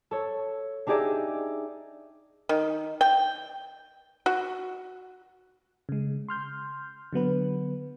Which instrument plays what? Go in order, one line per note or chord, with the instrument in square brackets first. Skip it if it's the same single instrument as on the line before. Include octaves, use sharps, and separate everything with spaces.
[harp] A4 C#5
D4 D#4 G4 G#4 D5 E5
[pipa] D#3
G5
F#4
[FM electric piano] C#3 G#3
C6 F6 G6
D3 F#3 B3 B4